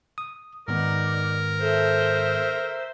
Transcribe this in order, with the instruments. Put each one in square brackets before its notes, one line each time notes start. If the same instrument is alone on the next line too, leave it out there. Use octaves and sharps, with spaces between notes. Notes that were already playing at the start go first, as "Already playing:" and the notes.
[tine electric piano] D#6
[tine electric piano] G#2 D#3 B3 [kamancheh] D#4 D5 [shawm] A#4
[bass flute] A4 [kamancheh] C5 E5